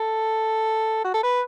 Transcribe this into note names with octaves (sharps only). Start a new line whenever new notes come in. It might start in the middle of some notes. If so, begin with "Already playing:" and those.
Already playing: A4
F#4
A4
B4